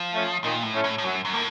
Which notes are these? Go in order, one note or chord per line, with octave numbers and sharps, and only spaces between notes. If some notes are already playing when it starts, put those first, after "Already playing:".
Already playing: F3
A3 C#4
A#2 D#3
A2
A3 C#4
A2
A2
F#2 F#3
F#2
A2 A#3